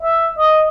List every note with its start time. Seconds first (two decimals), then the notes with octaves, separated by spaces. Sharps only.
0.03 E5
0.38 D#5